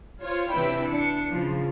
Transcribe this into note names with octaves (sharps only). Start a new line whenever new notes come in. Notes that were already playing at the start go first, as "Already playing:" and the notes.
F4 C5 C#5
C3 E3 D4 E4 B4 G5
D4 C#7
C#3 F3